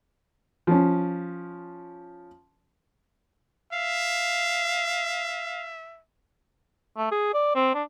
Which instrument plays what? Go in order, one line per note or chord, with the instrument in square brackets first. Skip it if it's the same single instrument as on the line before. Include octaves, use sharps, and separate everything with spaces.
[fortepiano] F3 C#4
[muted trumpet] E5 [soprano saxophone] F5
[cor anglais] A3
G#4
D5
C4
D4